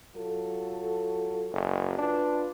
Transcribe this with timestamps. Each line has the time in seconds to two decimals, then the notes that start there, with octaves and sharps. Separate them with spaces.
0.16 F#3 F4 A4
1.52 F#1
1.98 D4 F4 B4